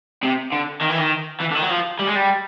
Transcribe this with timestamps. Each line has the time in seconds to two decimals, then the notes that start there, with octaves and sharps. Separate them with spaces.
0.23 C3
0.52 D3
0.82 D#3
0.90 E3
0.98 D#3
1.41 E3
1.51 D3
1.55 D#3
1.63 F#3
1.70 F3
1.99 G3
2.07 G#3
2.15 G3